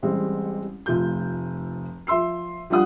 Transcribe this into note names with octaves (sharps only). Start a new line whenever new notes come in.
A1 G3 G#3 C4
F1 F3 A3 G6
F3 E5 C6 E6 C7
F3 G3 D4 F4 F#5 D#6